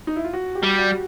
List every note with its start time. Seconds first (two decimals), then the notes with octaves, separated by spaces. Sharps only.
0.07 D#4
0.16 E4
0.24 F4
0.33 F#4
0.55 G4
0.63 G3
0.79 F#4